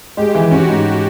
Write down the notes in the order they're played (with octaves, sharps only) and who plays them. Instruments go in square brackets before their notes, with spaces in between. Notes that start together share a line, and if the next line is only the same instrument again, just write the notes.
[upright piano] G#3 [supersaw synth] G4
[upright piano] E3
[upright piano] C#4 [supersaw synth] F#4
[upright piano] G#2